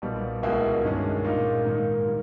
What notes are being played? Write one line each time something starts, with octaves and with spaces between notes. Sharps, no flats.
B1 A#2 G3 B3
C#2 B2 A#3 E4 G#4
G2 D#3 G#3 C#4
A#2 A#3 D#4
G#2 D#3 A#3
D#3 G3